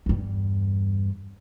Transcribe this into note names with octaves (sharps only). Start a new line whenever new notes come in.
E2 G2